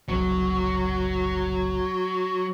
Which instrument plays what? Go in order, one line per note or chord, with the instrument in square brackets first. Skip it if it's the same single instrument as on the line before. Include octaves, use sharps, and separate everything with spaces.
[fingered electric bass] F#1 C2 [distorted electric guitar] F#3